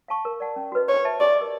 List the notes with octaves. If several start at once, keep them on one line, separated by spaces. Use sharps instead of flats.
F5 A5 C#6
A#4
D5 F#5 A5
C#4
F#4 B4 D#5
C5 C#5
E5 A5
G4 D5
D#5
A#4